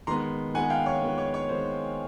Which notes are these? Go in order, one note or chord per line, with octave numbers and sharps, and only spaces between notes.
D#3 G#3 B3 A#5 C6
D#3 G#3 B3 F#5 G#5
F5 G5
C#5
D#3 G#3 B3
C#5
C#5
D#3 G#3 B3 C5